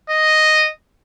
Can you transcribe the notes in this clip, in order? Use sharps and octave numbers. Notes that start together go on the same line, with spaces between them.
D#5